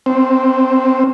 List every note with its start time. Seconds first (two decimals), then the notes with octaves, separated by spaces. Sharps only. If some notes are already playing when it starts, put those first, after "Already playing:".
0.06 C4